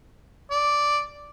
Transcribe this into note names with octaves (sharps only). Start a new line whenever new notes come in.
D5